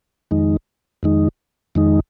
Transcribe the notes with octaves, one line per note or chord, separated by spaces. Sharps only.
F2 D#3 G#3 D#4
F2 D#3 G#3 D#4
F2 D#3 G#3 D#4